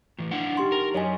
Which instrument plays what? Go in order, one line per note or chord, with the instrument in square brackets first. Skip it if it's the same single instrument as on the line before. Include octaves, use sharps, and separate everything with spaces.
[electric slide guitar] A2 E3
D4 E4 F#5
[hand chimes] D#4 G4 C6
[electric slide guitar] A#4
[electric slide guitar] F#2 F#3 [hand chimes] C#5 D#5 G#5